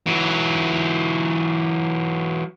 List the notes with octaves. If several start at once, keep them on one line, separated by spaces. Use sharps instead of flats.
E3 F#3